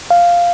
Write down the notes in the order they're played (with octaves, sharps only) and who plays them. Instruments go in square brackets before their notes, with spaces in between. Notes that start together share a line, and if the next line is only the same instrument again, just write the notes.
[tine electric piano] F5